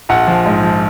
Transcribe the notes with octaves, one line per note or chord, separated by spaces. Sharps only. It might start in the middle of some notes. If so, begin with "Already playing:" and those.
A#1 F#5
F3
G#2
F3